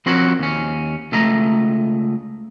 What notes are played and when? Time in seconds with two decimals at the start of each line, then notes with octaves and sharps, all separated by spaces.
0.06 F3 C4 F#4 A#4 C#5 F#5
0.39 D#2 C#4
1.12 C#2 A3 D#5 A#5